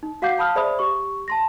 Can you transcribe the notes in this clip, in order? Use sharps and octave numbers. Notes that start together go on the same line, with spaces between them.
D#4
F#4 F5 F#5 D6 G6 C7
F5 A5 B5 D#6 F6
G#4 C5 D5 E5 B5 D#6
G4 C#6
A5 C6 A#6